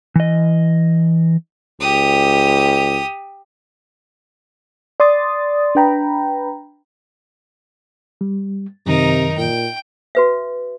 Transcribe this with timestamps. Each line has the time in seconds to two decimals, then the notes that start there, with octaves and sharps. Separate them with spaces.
0.16 E3 D#5
1.80 C#2 G4 D#6
5.00 D5 C6 D#6 A6
5.75 D4 B4 G5 A#5 B5
8.21 G3
8.86 F#2 C3 D#3 D#4 A#4
9.37 A#2 G5
10.15 F#4 B4 E5